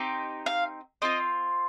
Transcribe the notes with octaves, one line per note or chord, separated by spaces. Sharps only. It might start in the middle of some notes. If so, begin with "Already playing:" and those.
Already playing: C4 D#4 G4
F5
C4 F4 D#5